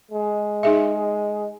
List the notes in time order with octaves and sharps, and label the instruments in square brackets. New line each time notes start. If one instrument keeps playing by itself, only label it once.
[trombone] G#3
[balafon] D#4 G#4 E5